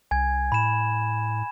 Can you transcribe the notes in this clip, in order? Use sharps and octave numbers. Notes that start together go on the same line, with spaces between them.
C2 G#5 G#6
A2 B5 E7